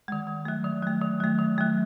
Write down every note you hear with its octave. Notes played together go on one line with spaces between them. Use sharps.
D#3 G#3
D#3
F#3 A3
D#3
F#3 A3
D#3
F#3 A3
D#3
F#3 A3